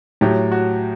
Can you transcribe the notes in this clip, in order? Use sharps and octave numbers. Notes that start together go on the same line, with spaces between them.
A2 F#3 G4
F#4